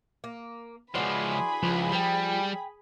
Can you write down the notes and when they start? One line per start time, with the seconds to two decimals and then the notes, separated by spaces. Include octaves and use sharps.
0.24 A#3
0.94 C#2 E3 F3 D4 F#4 G#4 B5 C6
1.63 C#2 F3
1.92 G3 G5 A5